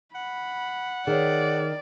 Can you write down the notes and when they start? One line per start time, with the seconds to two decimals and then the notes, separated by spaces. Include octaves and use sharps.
0.15 F#5 B5
1.07 D#3 G#4 C#5 D5